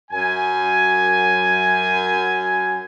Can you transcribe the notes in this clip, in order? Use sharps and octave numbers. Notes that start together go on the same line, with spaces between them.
F#2 G#5